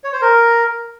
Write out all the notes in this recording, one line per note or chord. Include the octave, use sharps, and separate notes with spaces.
C#5
C5
A#4